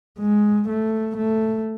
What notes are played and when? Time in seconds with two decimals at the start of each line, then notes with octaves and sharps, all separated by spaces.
0.19 G#3
0.68 A3
1.17 A3